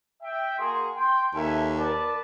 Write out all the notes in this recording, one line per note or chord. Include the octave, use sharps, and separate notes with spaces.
E5 G5
A#3 F#4 G#4 C6
G5 C6
D#2 A4 E5 G#5 A5
A#4 B4 D5 A5